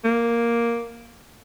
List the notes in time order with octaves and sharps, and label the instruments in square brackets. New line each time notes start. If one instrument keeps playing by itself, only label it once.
[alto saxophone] A#3